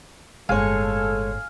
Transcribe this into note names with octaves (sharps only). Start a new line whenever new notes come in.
G1 A2 G#3 A4 C#5 F5 G#5